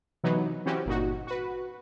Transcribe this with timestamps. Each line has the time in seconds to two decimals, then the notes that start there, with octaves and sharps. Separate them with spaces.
0.24 C3 E3 F#3 B3 D#4
0.66 E3 C4 C#4 F#4 G4
0.86 G1 A#2 D#4 F#4
1.27 F#4 B4